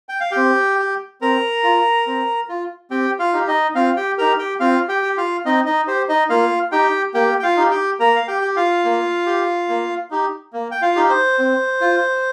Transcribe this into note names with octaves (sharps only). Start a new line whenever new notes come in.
G5
F5
C4 G4 G5
G4
C4 A#4 A#5
F4
C4
F4
C4 G4 G5
F4 F5
D#4 G4
D#4 D#5
C4 F4 F5
G4 G5
D#4 G4 A#4 A#5
G4 G5
C4 F4 F5
G4 G5
G4
F4 F5
C4 D#4 D#5
D#4 D#5
G4 C5
D#4 D#5
A#3 F4 F5
D#4 G4 G5
A#3 G4 G5
G5
F4 F5
D#4 G4
G4 G5
A#3 A#4 A#5
F5
G4 G5
G4
F4 F5
A#3
G4
A#3
D#4 G4
A#3
G5
F4 F5
D#4 G4
C5
C4
F4